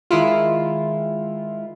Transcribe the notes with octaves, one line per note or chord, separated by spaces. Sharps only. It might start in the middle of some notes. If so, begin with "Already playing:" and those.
D#3 G#3 E4 F4